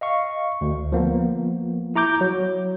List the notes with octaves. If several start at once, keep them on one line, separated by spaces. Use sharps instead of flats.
D#5 F5 C#6
D2
F3 A#3 B3
E4 A#5 D6 G6
F#3